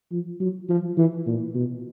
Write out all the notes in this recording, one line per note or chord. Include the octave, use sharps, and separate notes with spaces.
F3
F#3
F3
E3
A#2
B2